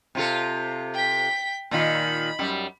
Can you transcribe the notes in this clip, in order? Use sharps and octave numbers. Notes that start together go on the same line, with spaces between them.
C3 F4 A4
G5 B6
A#2 D#3 F4 B5
F#2 G3